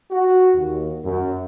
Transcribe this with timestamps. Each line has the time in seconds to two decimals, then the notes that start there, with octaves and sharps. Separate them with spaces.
0.11 F#4
0.54 D#2
1.04 F#2